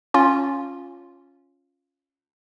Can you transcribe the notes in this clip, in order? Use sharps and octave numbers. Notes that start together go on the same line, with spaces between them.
C#4 F4